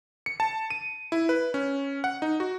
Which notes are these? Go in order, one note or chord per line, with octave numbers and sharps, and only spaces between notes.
C#7
A5
D#7
E4
B4
C#4
F#5
D#4
F#4